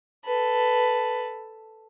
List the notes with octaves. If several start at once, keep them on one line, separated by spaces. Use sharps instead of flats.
A4 B4